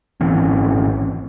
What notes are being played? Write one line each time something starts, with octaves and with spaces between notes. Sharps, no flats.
G#1 E3 C4 C#4